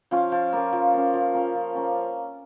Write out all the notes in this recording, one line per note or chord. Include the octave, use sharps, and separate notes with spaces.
F3 C#4 F4
F3
A#3 C#4
F3
A#3 C#4
F3
A#3 C#4
F3
A#3 C#4